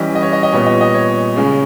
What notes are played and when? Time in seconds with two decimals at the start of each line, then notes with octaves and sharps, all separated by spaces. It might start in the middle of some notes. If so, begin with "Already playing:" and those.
Already playing: E3 G3 C#4 D#5
0.15 D#5
0.23 C#5
0.33 D#5
0.43 D#5
0.52 A#2 G3 B3 C#5
0.67 D#5
0.81 D#5
0.94 C#5
1.36 C#3 G#3 C#4